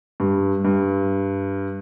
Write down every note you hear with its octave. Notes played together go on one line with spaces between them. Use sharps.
G2
G2